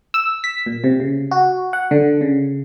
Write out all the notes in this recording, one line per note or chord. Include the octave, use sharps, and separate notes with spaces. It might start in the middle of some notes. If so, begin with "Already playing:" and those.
E6
B6
A#2
C3
C#3
F#4
F#5
D3
C#3